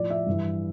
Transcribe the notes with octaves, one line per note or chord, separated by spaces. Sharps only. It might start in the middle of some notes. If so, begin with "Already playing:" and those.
Already playing: A2 F3 D5
E5
G2 E3